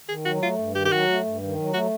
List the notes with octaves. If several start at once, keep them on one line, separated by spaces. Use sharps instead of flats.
D#3 G#4
F#3 F#4
A3 F4
G2
D#3 G4
G4
F#3 F#4
A3
G2
D#3
F#3
A3 F#4